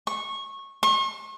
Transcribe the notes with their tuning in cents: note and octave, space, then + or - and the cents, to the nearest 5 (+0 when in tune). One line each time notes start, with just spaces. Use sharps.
C#6 -20
C#6 -45